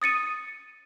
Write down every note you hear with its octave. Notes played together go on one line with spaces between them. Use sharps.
D#6 A6 C#7 D#7